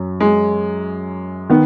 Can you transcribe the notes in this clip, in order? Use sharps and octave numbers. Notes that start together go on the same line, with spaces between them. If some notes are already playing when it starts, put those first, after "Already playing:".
Already playing: F#2
G#3
D#3 B3